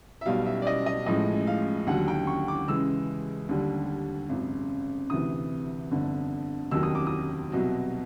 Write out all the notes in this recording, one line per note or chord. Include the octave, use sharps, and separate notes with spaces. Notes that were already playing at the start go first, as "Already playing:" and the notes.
E5
B1 B2 G3 F5
E5
D5
D#5
D#5
A1 A2 F3 G#3 D#5
F5
D#2 D3 F#3 F#5
G5
C#6
D6
C#2 C#3 E3 G#3 E6
D#2 D3 G3
G#1 F#2 C#3
D2 C3 E3 D#6
G1 F2 D3
F1 D#2 D#3 F#3 E6
D#6
D6
D#6
C2 B2 F#3